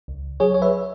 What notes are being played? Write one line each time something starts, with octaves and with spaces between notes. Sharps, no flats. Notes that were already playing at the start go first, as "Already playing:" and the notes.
C#2
F#3 G#4 C#5
C#5
B4 E5